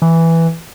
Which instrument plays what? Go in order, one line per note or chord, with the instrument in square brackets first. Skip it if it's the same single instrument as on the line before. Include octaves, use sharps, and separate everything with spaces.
[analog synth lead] E3